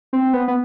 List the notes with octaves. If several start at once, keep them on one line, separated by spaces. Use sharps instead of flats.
C4
B3
B3